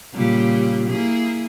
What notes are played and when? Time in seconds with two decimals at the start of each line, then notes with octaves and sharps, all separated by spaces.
0.14 A#2 C#3 G3
0.90 A#3 E4 G#4